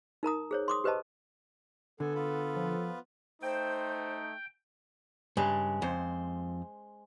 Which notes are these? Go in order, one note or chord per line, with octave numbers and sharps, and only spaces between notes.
D#4 A#4 A#5 D#6
G#4 C5 C#5
C6 D6 D#6
G4 B4 C5 D#5 A5
D3 B3 A4 G#5
B3 F4 B4
F3
A3 D#4 C5 G5
G2 C#3 G#3
F2 C5